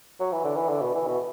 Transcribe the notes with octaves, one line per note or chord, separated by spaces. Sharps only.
F#3
E3
D3
E3
D3
B2
E3
B2